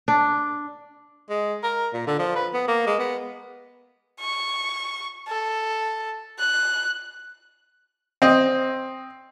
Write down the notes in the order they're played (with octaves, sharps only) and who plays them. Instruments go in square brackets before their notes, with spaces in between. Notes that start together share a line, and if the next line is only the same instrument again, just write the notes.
[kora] D4
[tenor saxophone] G#3
A#4
A#2
D3
F3
B4
B3
A#3
G#3
B3
[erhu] C#6
A4
F#6
[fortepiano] C4 D#5